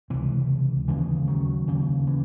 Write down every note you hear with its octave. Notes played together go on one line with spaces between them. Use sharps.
C#2 C3 E3
D#2 C#3 E3 G#3
D#3 F#3
D#2 C#3
E3